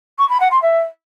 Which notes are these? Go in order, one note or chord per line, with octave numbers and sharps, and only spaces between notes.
C#6
B5
F#5
C6
E5